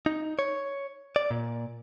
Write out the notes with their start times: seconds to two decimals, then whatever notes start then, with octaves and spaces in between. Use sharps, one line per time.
0.06 D#4
0.39 C#5
1.16 D5
1.31 A#2